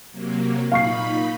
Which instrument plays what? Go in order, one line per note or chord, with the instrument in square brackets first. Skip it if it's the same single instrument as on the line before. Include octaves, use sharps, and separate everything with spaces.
[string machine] C3 F#3 A#3
[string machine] A#2 D#4 B5 [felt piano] F5 C#6 C7